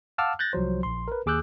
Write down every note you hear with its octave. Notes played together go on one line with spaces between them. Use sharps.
F5 F#5 A5 D6 E6 F6
F#6 G6 A6 A#6
C2 F3 F#3 C5
A#1 C6
A#4 B4
D#2 G#4 D6 E6 F#6 G6